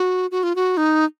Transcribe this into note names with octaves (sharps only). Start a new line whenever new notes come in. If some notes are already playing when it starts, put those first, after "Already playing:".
Already playing: F#4
F#4
F4
F#4
D#4